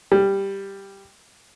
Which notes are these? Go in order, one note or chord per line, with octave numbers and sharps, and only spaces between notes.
G3